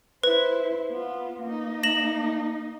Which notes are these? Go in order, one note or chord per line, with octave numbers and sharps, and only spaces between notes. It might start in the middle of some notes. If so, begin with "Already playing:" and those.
E4 B4 C5
B3 F4
A#3 D#4
A#6 E7 F#7